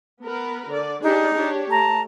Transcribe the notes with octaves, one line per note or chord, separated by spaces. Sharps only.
B3 A#4 B4
D3 D5
D4 D#4 G4 G#4
D4 G4 C#5
A3 A5 A#5